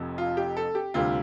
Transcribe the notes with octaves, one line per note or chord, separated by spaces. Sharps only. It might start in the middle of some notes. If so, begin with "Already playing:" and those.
Already playing: F1 F2 C3 F3
F4
G4
A4
G4
D2 C3 G3 F4